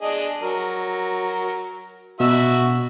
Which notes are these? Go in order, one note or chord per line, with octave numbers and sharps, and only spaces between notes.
D4 G#4 D#5
F#3 A#4
B2 F#4 E5 E6